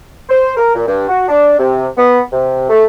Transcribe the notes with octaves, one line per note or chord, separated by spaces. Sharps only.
C5
A#4
A#2
G2
F#4
D4
C3
B3
C3
A3